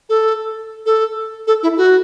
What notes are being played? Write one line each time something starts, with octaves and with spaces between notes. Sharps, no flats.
A4
A4
A4
E4
F#4